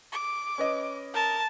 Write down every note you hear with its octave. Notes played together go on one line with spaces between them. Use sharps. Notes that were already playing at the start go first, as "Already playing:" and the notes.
D6
C#4 B4 D#5
A#4 A5